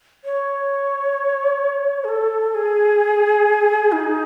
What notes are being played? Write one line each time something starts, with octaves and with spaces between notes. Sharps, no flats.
C#5
G#4
A4
G#4
D#4